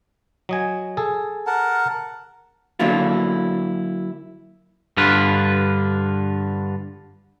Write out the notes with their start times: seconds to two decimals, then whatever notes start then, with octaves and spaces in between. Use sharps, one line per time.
0.49 F#3 D#5 G#5
0.97 G#4 A4
1.47 A#4 F#5 A5
2.79 D3 F#3 A#3 D4 E4 F4
4.97 G2 D3 F4 B4